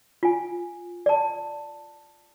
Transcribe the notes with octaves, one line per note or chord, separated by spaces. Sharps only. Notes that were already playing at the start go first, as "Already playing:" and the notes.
F4 G#5
D5 A5